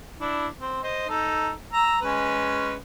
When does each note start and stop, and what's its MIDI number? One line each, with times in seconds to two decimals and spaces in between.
0.20 0.47 62
0.20 0.47 64
0.59 0.81 60
0.83 1.04 72
0.83 1.04 75
1.09 1.51 63
1.09 1.51 69
1.73 1.96 82
1.73 1.96 88
2.02 2.75 56
2.02 2.75 61
2.02 2.75 71